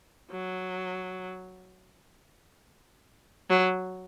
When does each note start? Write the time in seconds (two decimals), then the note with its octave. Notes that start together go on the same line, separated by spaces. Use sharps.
0.31 F#3
3.50 F#3